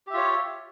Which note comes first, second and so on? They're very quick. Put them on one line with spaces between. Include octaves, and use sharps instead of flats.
G4 E5 F4 C#5